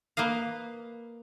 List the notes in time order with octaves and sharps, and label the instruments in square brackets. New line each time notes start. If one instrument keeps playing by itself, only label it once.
[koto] A#3 B4 D#5 F5